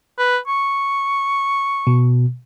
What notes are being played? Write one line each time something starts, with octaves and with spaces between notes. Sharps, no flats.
B4
C#6
B2